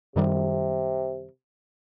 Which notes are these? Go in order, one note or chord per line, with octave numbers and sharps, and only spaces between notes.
F#2 C3 D#3 G3